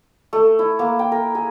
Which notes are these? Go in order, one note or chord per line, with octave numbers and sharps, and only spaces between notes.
A3
E4
A#3
G5
A#4
G#4